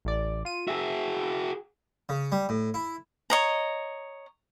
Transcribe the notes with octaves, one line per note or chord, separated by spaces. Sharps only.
A1 D5
F4 D#7
F#4 G#4 E5
C#3
G3
A2
E4
C#5 D#5 A#5